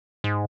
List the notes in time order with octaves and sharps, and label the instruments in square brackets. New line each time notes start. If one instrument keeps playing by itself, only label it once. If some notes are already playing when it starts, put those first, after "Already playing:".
[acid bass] G#2